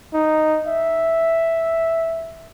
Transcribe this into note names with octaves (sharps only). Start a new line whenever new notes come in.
D#4
E5